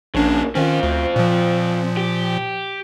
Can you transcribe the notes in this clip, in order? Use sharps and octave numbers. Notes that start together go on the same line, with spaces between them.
A#1 C#3 A#3 D4
D#3 C4 C#4 F4
D2
A#2 F3
G4